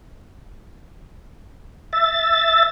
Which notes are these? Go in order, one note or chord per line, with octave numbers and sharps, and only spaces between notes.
E5 A6